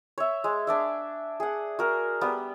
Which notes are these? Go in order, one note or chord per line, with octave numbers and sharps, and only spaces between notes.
C#5 E5
G#3
D4 D5 E5
G#4 F#5
F#4 A#4
G3 B3 B4